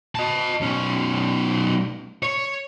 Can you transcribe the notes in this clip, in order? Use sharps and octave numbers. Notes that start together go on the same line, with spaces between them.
D#5 A5
B1 C#4
C#5